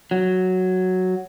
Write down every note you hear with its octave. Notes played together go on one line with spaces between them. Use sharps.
F#3